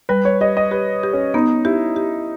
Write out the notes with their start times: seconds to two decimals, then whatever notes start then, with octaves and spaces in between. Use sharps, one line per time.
0.09 G3 B4
0.25 C#5
0.41 G4 D#5
0.57 D#5
0.71 G4 B4
1.03 G4
1.13 C#4
1.34 B3 D#4
1.65 E4 G4
1.96 G4